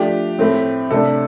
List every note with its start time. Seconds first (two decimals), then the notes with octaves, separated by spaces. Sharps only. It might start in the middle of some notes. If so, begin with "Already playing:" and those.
Already playing: F3 A3 D4 G4
0.39 A2 A3 C4
0.91 C3 A3 D4 A4